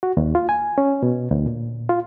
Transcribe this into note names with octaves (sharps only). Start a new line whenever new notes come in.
F#4
D#2
F4
G#5
C#4
B2
D2
A#2
F4